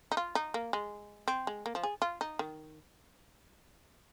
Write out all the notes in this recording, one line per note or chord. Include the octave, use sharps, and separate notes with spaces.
D#4
F4
D#4
A#3
G#3
C4
G#3
A#3
F3
G#4
F4
D#4
D#3